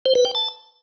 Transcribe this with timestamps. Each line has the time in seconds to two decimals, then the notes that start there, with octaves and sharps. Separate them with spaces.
0.06 C5
0.15 B4
0.25 G5
0.35 A5